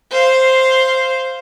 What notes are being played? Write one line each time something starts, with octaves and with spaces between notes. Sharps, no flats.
C5 F5